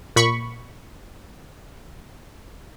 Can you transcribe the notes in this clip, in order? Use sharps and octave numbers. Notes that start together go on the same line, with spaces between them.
A#2 B5 C#6